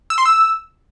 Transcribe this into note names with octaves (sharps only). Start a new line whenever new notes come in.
E6
C6
E6